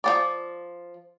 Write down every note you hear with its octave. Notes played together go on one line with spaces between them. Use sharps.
F3 C4 D5